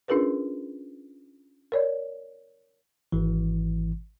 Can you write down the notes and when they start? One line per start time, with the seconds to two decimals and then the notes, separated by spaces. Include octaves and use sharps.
0.08 C#4 D4 F4 G#4 A#4 B4
1.72 A#4 C#5 D5
3.12 G#1 E3